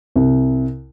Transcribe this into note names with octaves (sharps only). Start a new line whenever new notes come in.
C2